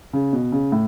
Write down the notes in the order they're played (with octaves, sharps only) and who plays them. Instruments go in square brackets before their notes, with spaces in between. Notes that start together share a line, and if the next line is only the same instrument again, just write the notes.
[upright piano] C#3
B2
C#3
A2